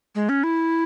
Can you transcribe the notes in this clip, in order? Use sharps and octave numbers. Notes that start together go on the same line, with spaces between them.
G#3
C#4
E4